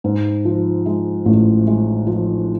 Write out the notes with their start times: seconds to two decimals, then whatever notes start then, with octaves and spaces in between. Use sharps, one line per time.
0.04 G#2
0.45 F3
0.86 G#3
1.25 A1
1.67 G#3
2.07 F3